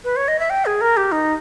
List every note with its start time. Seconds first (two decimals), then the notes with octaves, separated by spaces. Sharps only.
0.04 B4
0.16 C#5
0.28 D#5
0.39 E5
0.50 G5
0.65 G#4
0.81 A#4
0.97 G4
1.12 D#4